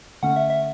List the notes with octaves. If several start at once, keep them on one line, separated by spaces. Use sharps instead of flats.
D3 A3 C#4 F#5
E5
E5